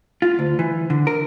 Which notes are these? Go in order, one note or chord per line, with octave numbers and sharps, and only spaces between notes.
F4
D2
E3
D3
A#4